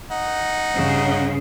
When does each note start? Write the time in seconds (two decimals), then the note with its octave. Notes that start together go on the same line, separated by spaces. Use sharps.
0.11 D#4 F#5
0.75 G2 C#3